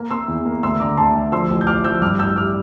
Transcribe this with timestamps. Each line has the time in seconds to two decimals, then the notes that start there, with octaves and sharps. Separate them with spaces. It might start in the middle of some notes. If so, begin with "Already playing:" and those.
Already playing: A#3
0.11 A#3 C6 E6
0.28 E2
0.45 A#3
0.63 D2 C6 E6
0.80 D3 A#5 D6
0.97 D2 A5 C6
1.15 D2
1.32 F3 C6 E6
1.50 A1
1.61 G6
1.67 A1 D6 F6
1.84 F3 E6 G6
2.02 G2 D6 F6
2.19 A1 E6 G6
2.36 G3 D6 F6